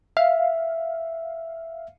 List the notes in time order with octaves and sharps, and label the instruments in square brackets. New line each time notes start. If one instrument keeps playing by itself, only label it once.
[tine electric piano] E5 [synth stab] F5